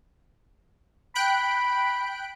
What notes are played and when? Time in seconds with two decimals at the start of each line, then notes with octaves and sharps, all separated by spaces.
1.15 G5 B5 F#6 D7